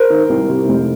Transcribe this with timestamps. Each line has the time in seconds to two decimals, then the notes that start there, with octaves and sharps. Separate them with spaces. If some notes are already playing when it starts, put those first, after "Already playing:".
Already playing: A#4 C5
0.10 D#3
0.29 C2
0.48 C3
0.68 F1